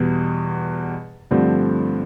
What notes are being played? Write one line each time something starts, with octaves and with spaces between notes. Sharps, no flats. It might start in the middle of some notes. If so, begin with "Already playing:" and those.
Already playing: E2 B2 G3
G2 D3 F3 A3 C4